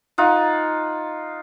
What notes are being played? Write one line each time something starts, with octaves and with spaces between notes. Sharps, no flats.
D#4 F4 F#5